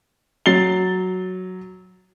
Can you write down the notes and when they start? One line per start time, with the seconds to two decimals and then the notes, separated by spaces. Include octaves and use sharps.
0.46 F#3 A6 C7 G7